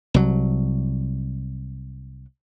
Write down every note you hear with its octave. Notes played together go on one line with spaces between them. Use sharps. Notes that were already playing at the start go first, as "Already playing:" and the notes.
C2 F#3